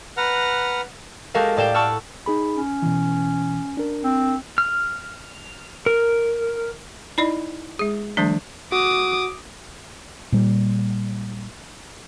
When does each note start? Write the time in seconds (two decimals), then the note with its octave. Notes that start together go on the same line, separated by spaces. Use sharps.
0.17 B4 F#5 A#5 F6
1.34 G#3 F#4 G4 A4 A#4 F5
1.57 A2 G4 D5 F5 G5 E7
1.74 F#5 A5 C#6 E6 F6
2.26 D#4 G#4 B5
2.56 C#4
2.82 B2 E3
3.77 D4 A#4
4.04 C4
4.58 F6
5.86 A#4
7.18 D#4 E4 D5 D#5
7.79 G#3 G#4
8.17 D#3 F3 G3 A3 D4
8.72 F#4 D6 D#6
10.32 A#2 G3